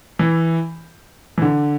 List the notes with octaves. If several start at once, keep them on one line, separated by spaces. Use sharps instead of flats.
E3
E3
D3